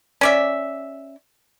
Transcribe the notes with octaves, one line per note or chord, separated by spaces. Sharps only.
C#4 D5 E5